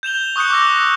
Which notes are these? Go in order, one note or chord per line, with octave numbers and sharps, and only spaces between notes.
G6 E7 F7 G7
C#6 D#6 F#6 G6 C#7
D6 E6 A#6